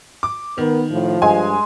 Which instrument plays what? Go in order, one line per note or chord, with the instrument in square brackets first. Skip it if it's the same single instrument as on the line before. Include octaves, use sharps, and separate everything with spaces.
[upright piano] D6
[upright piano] D#3 [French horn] B3 [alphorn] A#4
[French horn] A2 [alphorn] F3
[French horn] G2 [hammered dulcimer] G#3 [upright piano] G#5